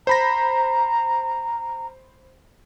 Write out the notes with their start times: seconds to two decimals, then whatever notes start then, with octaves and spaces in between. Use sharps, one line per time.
0.07 C5 A#5 B5 A#6